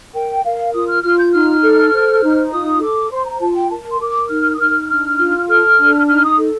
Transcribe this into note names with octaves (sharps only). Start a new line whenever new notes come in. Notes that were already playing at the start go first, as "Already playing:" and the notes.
A#4 G5
A#4 F5
F4 D#6
F6
F4 F6
G6
D#4 F6
A4
C5
D#4
F4 D#6
A4 D6
C5 C6
A#5
F4 A5
G5
A#4 A5
C6
A#4 D6
D#4 F6
D#6
D#4 F6
D4 F6
F4
A4 F6
D4
D#4 F6
D#6
A4